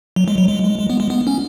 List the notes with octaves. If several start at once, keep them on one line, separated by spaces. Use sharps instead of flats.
F#3
G#3
F#3
G#3
G#3
G#3
B3
G#3
B3
C#4